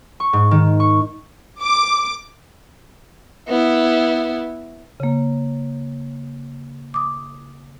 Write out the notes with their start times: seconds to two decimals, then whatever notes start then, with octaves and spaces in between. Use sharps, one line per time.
0.20 C#6
0.33 G#2
0.51 D#3
0.80 C#6
1.61 D6
3.48 B3 E4
5.00 C#3 A#3
6.94 D6 D#6